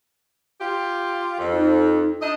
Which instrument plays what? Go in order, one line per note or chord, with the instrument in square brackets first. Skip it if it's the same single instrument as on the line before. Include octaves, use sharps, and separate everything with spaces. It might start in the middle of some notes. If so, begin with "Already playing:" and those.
[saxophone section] F4 G4
F2
[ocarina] D#4
[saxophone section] D4 D#5